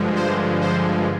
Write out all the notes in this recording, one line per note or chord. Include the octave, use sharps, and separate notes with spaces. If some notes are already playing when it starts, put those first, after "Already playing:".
Already playing: G2 D3 F3 G#3
C5
C5